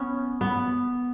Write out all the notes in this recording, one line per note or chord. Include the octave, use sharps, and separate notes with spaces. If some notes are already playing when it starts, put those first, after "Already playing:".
Already playing: B3 C#4
B3